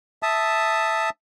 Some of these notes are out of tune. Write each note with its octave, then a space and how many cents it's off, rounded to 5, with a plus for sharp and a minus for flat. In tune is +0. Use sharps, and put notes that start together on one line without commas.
E5 +0 A5 +0 D#6 +0